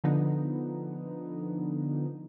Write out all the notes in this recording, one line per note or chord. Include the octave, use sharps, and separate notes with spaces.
D3 F3 B3 D#4